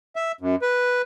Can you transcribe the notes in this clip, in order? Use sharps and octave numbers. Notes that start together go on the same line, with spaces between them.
E5
F#2
B4